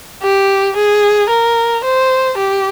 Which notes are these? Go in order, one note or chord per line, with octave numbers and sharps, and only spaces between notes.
G4
G#4
A#4
C5
G4